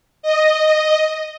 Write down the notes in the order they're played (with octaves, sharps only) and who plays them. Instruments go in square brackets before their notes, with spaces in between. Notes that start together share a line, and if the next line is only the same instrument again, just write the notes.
[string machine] D#5